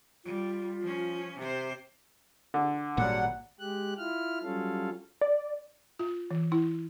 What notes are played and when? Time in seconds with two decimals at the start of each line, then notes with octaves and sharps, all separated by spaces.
0.25 G3 F4
0.82 F3 C#4
1.38 C3 G4 C5
2.54 D3
2.97 G#1 A#2 F#3 G3 A#3 F#5
3.60 G#3 G4 F#6
3.98 E4 F4 F6
4.43 F#3 G3 C#4 F4 A4 F5
5.21 D5
5.99 F4
6.30 E3
6.52 E4